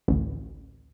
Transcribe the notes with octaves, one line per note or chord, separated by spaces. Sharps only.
A1 D2